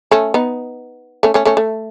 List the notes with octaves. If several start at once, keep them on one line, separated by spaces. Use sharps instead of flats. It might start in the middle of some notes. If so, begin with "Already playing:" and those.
A3 C#4
B3 D#4
A3 C#4
A3 C#4
A3 C#4
A3